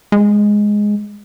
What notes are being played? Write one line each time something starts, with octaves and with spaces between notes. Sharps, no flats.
G#3